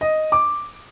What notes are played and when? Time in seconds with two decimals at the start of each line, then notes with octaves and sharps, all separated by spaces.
0.01 D#5
0.32 D6